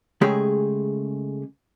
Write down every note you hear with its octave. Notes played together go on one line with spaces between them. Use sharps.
C#3 G#3 A3 G4 G#4